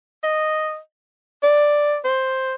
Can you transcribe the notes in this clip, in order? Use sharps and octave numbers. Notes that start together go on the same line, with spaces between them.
D#5
D5
C5